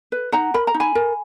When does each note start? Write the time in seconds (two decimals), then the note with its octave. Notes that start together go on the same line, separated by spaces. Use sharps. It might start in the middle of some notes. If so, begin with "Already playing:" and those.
0.12 B4
0.32 D#4 F#5 A#5
0.54 A#4 B5
0.67 A#5
0.74 D#4
0.80 G#5 B5
0.95 A#4